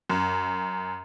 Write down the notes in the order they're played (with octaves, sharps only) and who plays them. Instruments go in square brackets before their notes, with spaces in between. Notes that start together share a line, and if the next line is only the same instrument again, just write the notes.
[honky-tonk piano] F#2